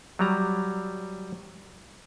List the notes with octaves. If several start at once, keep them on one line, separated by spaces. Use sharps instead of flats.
F#3 G3 A#5